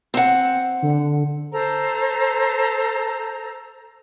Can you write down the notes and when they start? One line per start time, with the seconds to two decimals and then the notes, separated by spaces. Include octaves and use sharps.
0.14 C4 F#5
0.82 D3
1.52 A4 C5 A#5